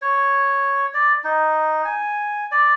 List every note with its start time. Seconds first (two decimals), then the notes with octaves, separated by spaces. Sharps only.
0.02 C#5
0.94 D5
1.24 D#4
1.85 G#5
2.52 D5